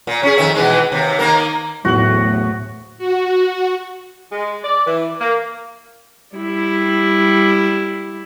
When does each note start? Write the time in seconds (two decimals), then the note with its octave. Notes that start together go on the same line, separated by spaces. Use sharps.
0.07 A#2
0.23 C#4 G#4
0.38 F2 D#3 E5
0.55 B2 E3 G#3
0.92 D#2 C3
1.19 D#3 A#3 A#4
1.85 D1 E2 A2 F#4 F#7
2.98 F#4
4.32 G#3
4.64 D5
4.86 E3
5.21 A#3
6.36 G3 E4